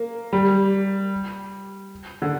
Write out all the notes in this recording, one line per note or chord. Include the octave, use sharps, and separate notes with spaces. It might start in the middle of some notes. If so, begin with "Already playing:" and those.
Already playing: A#3
G3
D3